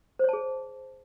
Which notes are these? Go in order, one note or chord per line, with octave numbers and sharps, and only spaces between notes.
G#4 C5 C#5 A5